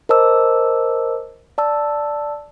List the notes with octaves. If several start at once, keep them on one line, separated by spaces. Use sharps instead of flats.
A#4 C5 D#5 A5 D6 E6
D5 A5 E6